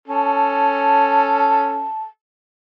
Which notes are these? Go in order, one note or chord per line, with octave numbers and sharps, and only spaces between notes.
C#4 A4 A5